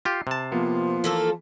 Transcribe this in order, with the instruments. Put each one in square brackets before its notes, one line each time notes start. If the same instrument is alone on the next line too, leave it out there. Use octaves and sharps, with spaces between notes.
[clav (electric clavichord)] F4 G4 [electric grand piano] C7
[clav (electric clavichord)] C3 A5
[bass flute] F3 [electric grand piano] A#3 B3 F4
[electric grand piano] E3 [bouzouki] A3 A#3 A4